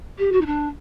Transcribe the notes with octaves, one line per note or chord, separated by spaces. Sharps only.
G4
F#4
D#4
D4